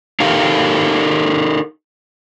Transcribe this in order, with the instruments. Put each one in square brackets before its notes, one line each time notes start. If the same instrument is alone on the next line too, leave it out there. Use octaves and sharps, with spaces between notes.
[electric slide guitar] D#4 G4 A4 A#4 F5